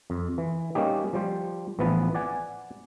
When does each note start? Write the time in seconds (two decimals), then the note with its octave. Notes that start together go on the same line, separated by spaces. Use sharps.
0.10 F2
0.38 E3
0.75 G3 A#3 C#4 D#4 G4
1.13 F3 G3 C5
1.79 A1 E3 F3 B3 B4 A5
2.15 D5 F#5 G#5